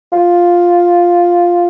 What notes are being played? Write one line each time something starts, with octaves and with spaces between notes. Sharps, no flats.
F4